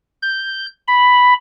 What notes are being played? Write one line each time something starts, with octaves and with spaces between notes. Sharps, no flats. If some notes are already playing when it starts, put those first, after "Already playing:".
G6
B5